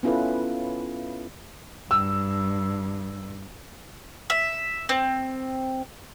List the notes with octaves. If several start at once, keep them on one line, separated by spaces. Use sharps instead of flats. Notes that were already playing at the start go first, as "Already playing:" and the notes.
B3 C#4 E4 F4 A4 B4
G2 E6
E5
C4